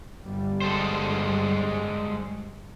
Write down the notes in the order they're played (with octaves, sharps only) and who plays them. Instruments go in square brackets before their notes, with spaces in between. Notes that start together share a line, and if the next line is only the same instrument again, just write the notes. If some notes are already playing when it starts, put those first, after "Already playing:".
[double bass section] G1 G3
[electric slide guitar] G#3 A4 C5